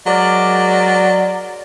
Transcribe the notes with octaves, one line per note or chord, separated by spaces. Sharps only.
F#3 G#3 A#4 D5